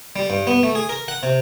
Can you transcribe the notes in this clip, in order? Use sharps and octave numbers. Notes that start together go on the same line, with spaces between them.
G3
G2
B3
A3
G#4
A#4
F#5
C3